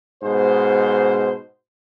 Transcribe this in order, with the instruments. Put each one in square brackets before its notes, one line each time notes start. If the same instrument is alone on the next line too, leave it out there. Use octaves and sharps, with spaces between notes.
[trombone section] G#2 B2 C5